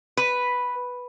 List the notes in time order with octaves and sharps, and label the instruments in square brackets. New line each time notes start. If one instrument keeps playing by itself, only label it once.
[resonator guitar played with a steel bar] B4